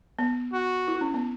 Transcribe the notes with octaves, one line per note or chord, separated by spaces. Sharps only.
B3
F#4
E4
C#4
B3